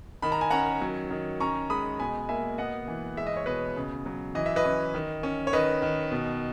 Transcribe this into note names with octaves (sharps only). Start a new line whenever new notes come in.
D#3 B5
A#5
G#5
C#4 F#5 A#5
F#3
D#3
C#4 A#5 C#6
G#3 B5 D#6
B2 G#5 B5
A#3 E5 G#5
B3 D#5 F#5
E3
G#3 E5
D#5
C#5
B2 B4 D#5
C#3
F#3
E3 D#5
E5
B4 D#5
C#4
D#3
C#4
C#5
D#3 B4 D#5
D#3
B2